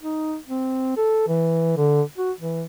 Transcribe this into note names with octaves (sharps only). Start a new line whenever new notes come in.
D#4
C4
A4
E3
D3
F#4
E3